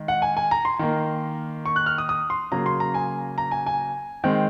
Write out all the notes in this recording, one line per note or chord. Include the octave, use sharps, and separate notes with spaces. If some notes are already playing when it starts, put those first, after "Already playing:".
Already playing: D#3 G#3
F#5
G#5
G#5
A#5
C6
D#3 A#3
C#6
F#6
F6
D#6
D#6
C6
C#3 F#3 A#3 A#5
C6
A#5
G#5
A#5
G#5
G#5
D#3 G#3 C4